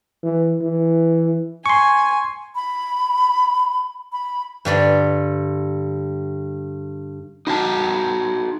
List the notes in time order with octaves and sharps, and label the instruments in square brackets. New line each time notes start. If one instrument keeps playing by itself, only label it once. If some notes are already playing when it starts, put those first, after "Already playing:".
[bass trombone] E3
E3
[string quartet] G#5 [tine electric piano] C6 C#6
[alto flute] B5
B5
[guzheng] G2 D3 D5
[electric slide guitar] D#4 F#4 G5 A5